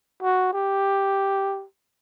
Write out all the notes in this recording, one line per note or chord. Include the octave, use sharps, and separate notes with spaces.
F#4
G4